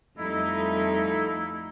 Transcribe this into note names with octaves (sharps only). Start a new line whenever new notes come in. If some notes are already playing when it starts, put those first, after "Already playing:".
F2 G3 A3 D#4 E4